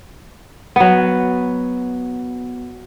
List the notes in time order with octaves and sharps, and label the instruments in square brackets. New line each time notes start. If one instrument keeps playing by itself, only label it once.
[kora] F#3 B3